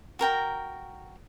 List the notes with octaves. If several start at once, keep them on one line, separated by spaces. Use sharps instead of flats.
F#4 A#4 G5 A#5